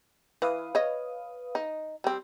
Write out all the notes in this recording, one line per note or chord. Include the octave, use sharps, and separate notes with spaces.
E3 B4 F5 D#6
C#5 D#5
D#4
G3 C4